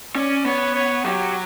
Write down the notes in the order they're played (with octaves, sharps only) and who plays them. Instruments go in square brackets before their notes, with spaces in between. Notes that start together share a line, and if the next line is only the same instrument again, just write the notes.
[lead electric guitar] C#4 [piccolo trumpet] D5
[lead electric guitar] B3 [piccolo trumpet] C#5
[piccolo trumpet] C#5
[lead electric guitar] F#3 [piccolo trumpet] G4